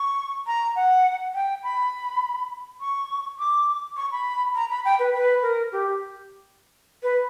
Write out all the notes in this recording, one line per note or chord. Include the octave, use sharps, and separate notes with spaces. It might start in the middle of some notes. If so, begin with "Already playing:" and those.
Already playing: C#6
A#5
F#5
G5
B5
C#6
D6
C#6
B5
A#5
B5
G5
B4
B4
A#4
G4
B4